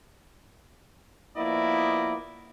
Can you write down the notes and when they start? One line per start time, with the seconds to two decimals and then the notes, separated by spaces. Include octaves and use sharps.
1.36 F3 A#3 B3 E4 D5 D#5